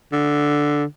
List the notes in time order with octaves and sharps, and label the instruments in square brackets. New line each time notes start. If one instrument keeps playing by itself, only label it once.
[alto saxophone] D3